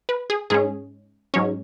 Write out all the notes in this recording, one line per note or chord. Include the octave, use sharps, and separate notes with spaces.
B4
G#4
G#2 G#3 C#4 G#4
G#2 F#3 C#4 C#5